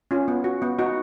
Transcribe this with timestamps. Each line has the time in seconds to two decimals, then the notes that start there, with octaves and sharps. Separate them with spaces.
0.11 C#4 F4
0.28 B3
0.44 F#4
0.62 B3
0.79 D#4 F#4